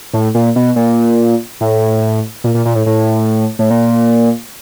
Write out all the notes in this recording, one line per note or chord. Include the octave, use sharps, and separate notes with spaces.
A2
A#2
B2
A#2
A2
A#2
A#2
A#2
A2
A2
A2
A#2